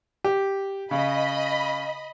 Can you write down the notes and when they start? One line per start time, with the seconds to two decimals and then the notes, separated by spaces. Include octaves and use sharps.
0.24 G4
0.91 C#3 D#5 B5